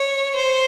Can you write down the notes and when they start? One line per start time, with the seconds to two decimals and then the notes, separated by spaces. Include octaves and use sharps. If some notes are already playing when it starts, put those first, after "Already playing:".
Already playing: C#5
0.36 C5